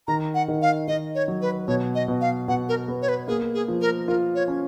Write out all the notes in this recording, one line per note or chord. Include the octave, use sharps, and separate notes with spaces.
D#3 A#5
F#5
D#3
F5
D#3 D#5
C#5
F#3
B4
B2 C#5
D#5
B2
F5
B2 F#5
A#4
B3
C#5
B4
A#3 G#4
G#4
F3
A#4
F4 A#4
C#5
C#4